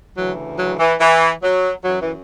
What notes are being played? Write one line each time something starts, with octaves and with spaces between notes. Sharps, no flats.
D2 C#3 E3 F#3
F#3
E3
E3
F#3
F#2 E3 F#3
E3